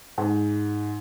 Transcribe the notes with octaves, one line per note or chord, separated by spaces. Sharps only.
G#2